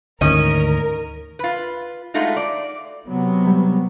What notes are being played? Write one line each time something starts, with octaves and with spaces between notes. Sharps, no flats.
D2 G#2 D#3 C#4 A#4 D#5
F4 B4
G#3 A3 D#4 F4 F#4
D5
C3 F#3 B3
G3